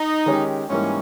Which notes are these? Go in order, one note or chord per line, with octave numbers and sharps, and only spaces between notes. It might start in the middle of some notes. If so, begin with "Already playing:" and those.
Already playing: D#4
D#3 G#3 C#4 G4
G#2 E3 G3 A#3 C#4